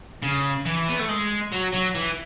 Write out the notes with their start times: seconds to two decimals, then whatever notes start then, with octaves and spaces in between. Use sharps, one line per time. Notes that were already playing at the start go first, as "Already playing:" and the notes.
0.22 C#3
0.65 E3
0.89 B3
0.99 A3
1.09 G#3
1.52 F#3
1.73 F#3
1.95 E3